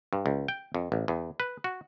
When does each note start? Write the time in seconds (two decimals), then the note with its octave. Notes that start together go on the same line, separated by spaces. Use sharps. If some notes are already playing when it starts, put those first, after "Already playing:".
0.13 G2
0.26 C#2
0.48 G5
0.75 F2
0.92 A1
1.08 E2
1.40 B4
1.64 F#4